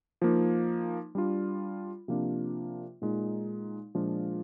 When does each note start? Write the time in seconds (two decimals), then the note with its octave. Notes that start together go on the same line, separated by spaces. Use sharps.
0.22 F3 A#3 D#4
1.15 G3 D4 F4
2.08 C3 F3 A#3 D4 F4
3.02 A#2 G#3 D#4
3.95 A#2 F3 G#3 D4 F4